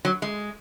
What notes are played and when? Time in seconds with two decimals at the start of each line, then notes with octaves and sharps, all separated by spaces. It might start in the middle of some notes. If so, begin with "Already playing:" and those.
0.05 F#3
0.22 G#3